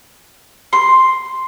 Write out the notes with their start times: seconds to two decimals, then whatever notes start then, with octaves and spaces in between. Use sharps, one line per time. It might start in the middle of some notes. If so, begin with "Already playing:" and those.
0.73 C6